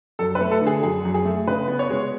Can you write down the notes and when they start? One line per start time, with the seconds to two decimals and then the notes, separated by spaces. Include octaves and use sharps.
0.19 F#2 A4
0.35 B4
0.41 A3
0.51 A4
0.61 D3
0.67 G#4
0.83 F#2 G#4
1.05 F#2
1.14 G#4
1.25 A3
1.47 C#3 B4
1.68 B3
1.79 C#5
1.90 G#3